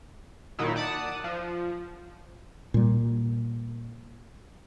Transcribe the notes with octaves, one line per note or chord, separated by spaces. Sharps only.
A#2 D#3 F#3 D#4 E4
D5 F#5 A5 D#6
F3
A#2 G3